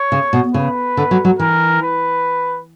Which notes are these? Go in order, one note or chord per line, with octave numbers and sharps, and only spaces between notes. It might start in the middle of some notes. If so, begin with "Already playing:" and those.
Already playing: C#5
C#3
B2
C#3 B4
D3
F#3
F#3
E3 A#4
B4